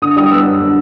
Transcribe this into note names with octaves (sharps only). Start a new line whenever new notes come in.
D3 D#6
G3 D#6
B3 E6
F#2
D3